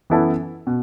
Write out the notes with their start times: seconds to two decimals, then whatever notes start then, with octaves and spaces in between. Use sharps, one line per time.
0.10 F#2 E3 B3 E4 A4
0.67 B2